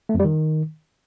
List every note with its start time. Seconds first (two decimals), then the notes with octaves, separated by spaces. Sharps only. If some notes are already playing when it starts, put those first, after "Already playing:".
0.09 A3
0.14 F2
0.20 G3
0.25 D#3